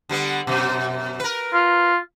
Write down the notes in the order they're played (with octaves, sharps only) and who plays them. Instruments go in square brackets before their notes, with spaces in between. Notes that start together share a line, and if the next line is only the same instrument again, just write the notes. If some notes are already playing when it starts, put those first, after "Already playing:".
[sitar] D3 G3 B3
F#2 B2
A#4 B4
[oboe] F4